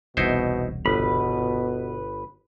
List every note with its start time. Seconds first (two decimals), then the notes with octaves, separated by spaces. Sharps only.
0.17 E1 C2 B2 D#4 E4 C5
0.86 G1 B2 B4 B5